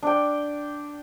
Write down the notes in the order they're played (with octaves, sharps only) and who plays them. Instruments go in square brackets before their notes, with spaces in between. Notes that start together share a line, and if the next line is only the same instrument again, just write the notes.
[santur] D4 G5